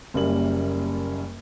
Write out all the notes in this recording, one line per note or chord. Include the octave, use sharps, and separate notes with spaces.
F#1 F#2 G3 A#3 F#7